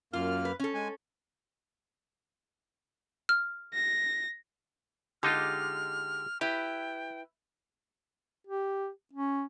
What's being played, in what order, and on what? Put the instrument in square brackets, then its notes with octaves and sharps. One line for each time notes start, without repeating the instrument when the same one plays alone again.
[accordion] F#2 A#3 F6 [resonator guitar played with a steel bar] F4
[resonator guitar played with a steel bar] B4
C#4 A4
[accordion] G#3 G#5
[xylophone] F6
[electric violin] A#6
[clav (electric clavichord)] D3 D#4 F4 [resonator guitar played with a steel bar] G#3 G4 [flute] F6
[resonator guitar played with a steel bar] E4 B4 [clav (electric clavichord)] G4 [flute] G5
[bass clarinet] G4
C#4